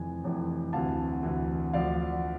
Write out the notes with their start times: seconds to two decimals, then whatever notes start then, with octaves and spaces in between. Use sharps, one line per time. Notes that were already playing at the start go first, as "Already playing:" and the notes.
Already playing: F1 F2 E3 G#5
0.24 F1 F2 E3
0.73 D2 C3 E3 F5 A5
1.23 D2 C3 E3
1.73 D2 D3 F3 D5 F5